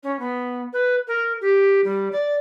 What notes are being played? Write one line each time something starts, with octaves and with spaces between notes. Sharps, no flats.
C#4
B3
B4
A#4
G4
G3
D5